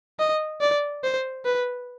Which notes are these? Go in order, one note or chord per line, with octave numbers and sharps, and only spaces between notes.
D#5
D5
C5
B4